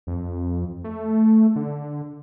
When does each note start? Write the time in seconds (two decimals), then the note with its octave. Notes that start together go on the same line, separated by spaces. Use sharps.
0.07 F2
0.84 A3
1.56 D3